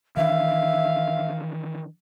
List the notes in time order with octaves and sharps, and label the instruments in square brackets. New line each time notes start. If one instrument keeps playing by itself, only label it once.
[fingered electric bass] D#3 E3 D4 [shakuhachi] E5 [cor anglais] F5